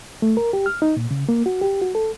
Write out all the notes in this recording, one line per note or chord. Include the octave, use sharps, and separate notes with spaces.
A3
A#4
G4
F6
D#4
A#2
C#3
A#3
F#4
G4
F#4
A4